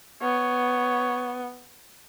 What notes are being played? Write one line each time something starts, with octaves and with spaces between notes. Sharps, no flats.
B3 C#5